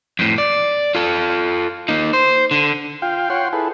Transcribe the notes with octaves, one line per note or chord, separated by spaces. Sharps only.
F2 A2
D5
F4 A4
A#3 D#4
C5
D3
F4 F5 G5
F4 C#5 F#5 G5 C6
E4 G#4 A4 B4